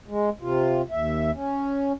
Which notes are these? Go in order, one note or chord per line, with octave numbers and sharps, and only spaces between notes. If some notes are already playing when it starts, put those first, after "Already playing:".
G#3
C3 F4
D#2 E5
C#4